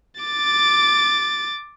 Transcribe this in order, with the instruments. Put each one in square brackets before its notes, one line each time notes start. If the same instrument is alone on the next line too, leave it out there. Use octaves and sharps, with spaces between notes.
[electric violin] D6 A6